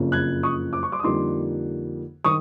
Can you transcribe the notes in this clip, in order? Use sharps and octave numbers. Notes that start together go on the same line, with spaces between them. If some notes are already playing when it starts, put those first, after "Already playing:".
Already playing: F#1 F2 C#3
F#6 G#6
C#6 D#6
D6
C#6
C6 D6
D#6
F2 D3 G3 A#3 D#4 C6 D6
D#3 C#6 D#6